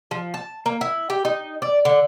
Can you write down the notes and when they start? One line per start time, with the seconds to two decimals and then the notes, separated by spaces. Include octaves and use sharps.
0.11 F3
0.34 A5
0.66 A#3
0.81 E4
1.10 G4
1.25 D#4
1.62 D5
1.85 D3